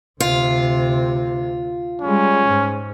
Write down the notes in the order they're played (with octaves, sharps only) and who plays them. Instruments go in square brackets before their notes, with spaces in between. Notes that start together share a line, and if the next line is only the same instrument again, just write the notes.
[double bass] D2 C3 [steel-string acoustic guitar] F4
[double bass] G3 G#3 [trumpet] C#4
[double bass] G#2